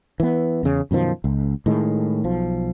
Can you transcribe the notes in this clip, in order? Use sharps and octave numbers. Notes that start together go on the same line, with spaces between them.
E3 B3
E2 C#3
F#2 B2 D#3 F3
C#2
A2 D#3 G#3
B1 F3